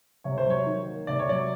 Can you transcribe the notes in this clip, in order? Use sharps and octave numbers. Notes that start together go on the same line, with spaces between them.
C3 C#5
C5
F#3 C#5
D#3
A#3
C3 D5
C#5
F#3 D5